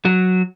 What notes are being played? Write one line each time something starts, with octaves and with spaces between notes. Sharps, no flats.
F#3